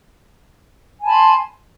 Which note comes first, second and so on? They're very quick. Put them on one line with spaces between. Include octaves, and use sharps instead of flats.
G#5 A5 B5 C6